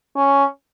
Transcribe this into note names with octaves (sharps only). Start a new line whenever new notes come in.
C#4